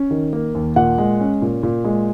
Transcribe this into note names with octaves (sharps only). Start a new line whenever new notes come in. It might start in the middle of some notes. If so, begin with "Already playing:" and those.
Already playing: C#4
D#3
A#3
D#2
A#2 F#5
G#3
C#4
A#2
A#2
G#3